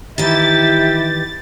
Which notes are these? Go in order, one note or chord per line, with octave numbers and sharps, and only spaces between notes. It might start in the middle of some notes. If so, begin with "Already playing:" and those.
D#3 E3 E4 G4 A6